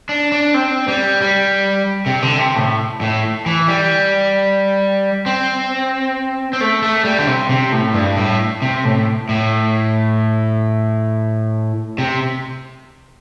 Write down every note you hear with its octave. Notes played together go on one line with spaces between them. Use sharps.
D4
D4
C4
G3
G3
C3
D3
C3
A2
A2
E3
G3
C4
C4
A3
A3
G3
D3
C3
C3
A2
G2
A2
C3
A2
A2
C3